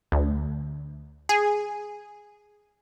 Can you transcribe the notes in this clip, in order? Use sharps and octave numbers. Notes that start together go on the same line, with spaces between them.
D2
G#4